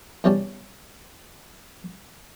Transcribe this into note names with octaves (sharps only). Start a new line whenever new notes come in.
E2 C3 G3 C#4 G4 A5